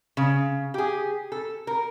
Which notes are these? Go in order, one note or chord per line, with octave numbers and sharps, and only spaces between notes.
C#3
G4 G#4
A4
A#4